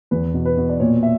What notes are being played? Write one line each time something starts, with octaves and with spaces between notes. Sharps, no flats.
E2 B4
B2
B4
B2
D5
A#2 C#5
E5